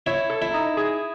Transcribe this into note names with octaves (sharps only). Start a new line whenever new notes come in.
E4 C#5
A4
E4
D#4
G#4